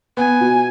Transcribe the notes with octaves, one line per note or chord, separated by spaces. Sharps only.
B3 G#5
B2